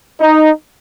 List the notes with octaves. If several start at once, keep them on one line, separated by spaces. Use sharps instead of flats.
D#4